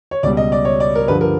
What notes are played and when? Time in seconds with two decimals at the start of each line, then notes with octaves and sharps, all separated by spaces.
0.11 C#5
0.23 C#2 B2 G3 D5
0.37 D#5
0.52 D5
0.65 C#5
0.80 D5
0.95 A#4
1.08 G2 D3 F3 B4
1.21 A#4